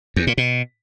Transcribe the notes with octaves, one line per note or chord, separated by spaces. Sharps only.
E2
A#2
B2